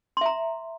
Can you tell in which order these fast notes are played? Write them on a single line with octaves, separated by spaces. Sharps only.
C6 E5 A#5